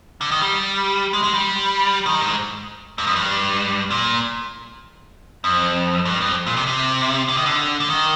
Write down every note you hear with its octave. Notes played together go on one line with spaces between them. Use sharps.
D3
D#3
G3
G#3
G#3
G3
D#3
G#2
G2
F2
G2
A#2
F2
G2
F2
A#2
C3
C3
D3
D#3
D3
D3
D#3